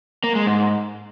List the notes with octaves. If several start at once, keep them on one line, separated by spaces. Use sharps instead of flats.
A#3
G#3
G#2